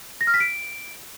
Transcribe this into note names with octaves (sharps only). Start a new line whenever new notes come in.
A#6
F6
B6
D7